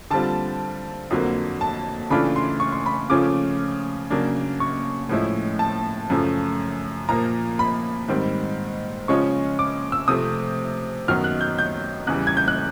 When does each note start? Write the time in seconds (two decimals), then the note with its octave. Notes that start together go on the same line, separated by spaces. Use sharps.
0.11 D3 G3 C4 F4 A5
1.10 F2 D3 F#3 A#3
1.61 A5
2.10 C#3 E3 A3 D4 F4 B5
2.36 C6
2.60 C#6
2.72 C6
2.86 B5
3.10 C#3 F3 A3 C#4 F4 D6
4.10 C#3 F#3 A#3 D4
4.60 C#6
5.09 A2 F3 G#3 C#4 E4
5.59 A5
6.10 F#2 C#3 F3 A3
7.09 A#2 F3 A#3 A#5
7.59 B5
8.08 G#2 D#3 G3 C4
9.08 C#3 F3 G#3 C#4 F4 C#6
9.59 D6
9.92 E6
10.08 C3 F3 A3 C4 D#6
11.08 F#2 D#3 F#3 B3 D#4 F6
11.24 F#6
11.41 G6
11.59 G6
12.07 E2 C#3 E3 G3 F#6
12.27 G#6
12.37 G6
12.48 F#6